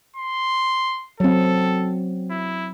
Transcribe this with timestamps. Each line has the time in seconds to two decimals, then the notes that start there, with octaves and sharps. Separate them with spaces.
0.16 C6
1.20 F#3 C4 A4
2.30 E4